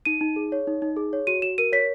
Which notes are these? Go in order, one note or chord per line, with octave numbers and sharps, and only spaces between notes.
D#4 D#7
D#4
G#4
C#5
D#4
D#4
G#4
C#5
F#4 D#7
F#4 E7
A#4 D#7
C#5 B6